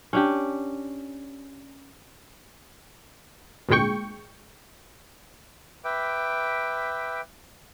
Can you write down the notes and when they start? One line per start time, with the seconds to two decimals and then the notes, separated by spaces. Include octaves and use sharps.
0.13 C#4 D4 G4
3.69 G#1 D2 A#2 G#3 G5 C#6
5.85 B4 E5 G5 D6